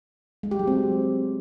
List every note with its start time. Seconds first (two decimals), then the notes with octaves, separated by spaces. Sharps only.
0.43 G#3
0.51 G4
0.59 F#3
0.67 C4